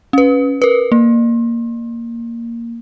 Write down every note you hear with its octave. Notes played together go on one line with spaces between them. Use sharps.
C#4 B4
A#4 B4
A#3